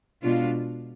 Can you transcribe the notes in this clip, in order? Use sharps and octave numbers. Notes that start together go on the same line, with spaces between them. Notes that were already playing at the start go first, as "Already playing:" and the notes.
B2 G#3 D4 F4